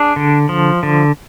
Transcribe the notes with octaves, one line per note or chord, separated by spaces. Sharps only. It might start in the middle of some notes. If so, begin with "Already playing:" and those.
Already playing: D4 G#4
D3
F3
D3